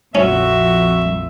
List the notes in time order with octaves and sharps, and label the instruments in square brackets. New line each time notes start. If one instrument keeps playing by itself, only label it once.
[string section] A#1 F2 [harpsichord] C#4 [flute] F#4 [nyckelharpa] E5